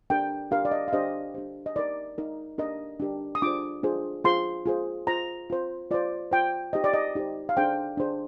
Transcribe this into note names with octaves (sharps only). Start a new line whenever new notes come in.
D4 G4 A#4 G5
D4 G4 A#4 F5
D5
D#5
F5
D4 G4 C5 D#5
D4 G4 C5
D#5
D#4 A#4 D5
D#4 A#4
D4 G4 A#4 D#5
D4 G4 A#4
D#6
D4 F4 G#4 C5 D6
D4 F4 G#4 C5
F4 G#4 C5 C6
F4 G#4 C5
F4 C5 A#5
F4 C5
F4 C5 D5
F4 C5 G5
D#4 G4 C5 D#5
D5
D#5
D#4 G4 C5
F5
D4 G#4 C5 G5
D4 G#4 C5